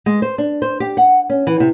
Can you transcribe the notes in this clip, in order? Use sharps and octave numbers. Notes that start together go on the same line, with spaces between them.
G#3
C5
D4
C5
G4
F#5
C#4
E3
C3